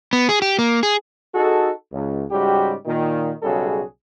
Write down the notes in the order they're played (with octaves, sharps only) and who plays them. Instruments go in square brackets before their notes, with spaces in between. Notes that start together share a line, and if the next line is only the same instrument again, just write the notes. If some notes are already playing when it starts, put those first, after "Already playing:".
[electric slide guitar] B3
G#4
G4
A#3
G#4
[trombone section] D#4 F#4 G#4 A4
C#2
G#2 C#3 G3 F#4 G4
A#2 D#3
B1 C#3 G3 F#4 G#4 A4